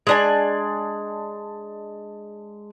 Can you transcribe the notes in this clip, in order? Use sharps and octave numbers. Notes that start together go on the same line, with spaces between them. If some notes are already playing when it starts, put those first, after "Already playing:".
G#3 D4 G#5